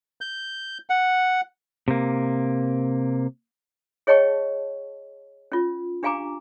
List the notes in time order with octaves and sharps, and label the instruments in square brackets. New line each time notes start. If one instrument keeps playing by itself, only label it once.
[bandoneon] G6
F#5
[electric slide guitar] C3 A#3
[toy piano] G#4 C#5 D#5 G5 A5 C#6
C#4 F4
D4 G4 F5 G#5 A#5 D6